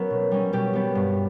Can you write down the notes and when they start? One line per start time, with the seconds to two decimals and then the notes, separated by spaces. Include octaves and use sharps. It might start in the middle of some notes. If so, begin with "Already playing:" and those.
Already playing: F#3 B3 C#4 A#4
0.10 B2
0.31 G3 C#4
0.53 B2 G4
0.73 G3 B3
0.95 G2